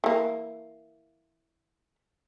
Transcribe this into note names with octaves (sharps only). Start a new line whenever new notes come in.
E3 A#3